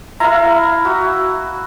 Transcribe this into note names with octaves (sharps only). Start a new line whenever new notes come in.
E4 F5 A#5
F#4